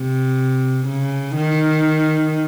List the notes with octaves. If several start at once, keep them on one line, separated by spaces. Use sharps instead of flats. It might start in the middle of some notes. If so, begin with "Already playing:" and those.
Already playing: C3
C#3
D#3